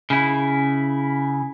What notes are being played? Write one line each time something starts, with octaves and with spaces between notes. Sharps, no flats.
C#3 E4